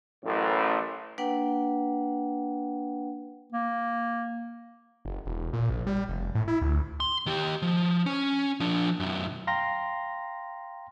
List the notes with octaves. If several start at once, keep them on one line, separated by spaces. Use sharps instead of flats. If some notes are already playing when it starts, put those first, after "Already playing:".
A1 F#2 A2
A#3 D4 B4 F#5 G5
A#3
F#1
E1
A#2
A#1
G3
F1
A2
E4
D2
C6
D#3 G4
F3
C#4
F3 D4
B1 F#2
F5 G5 A#5 C6 A#6